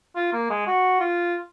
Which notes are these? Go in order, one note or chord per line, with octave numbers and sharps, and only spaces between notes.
F4
A#3
G#3
F#4
F4